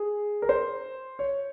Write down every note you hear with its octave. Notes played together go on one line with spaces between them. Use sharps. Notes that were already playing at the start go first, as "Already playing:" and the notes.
Already playing: G#4
A#4
C5
C#5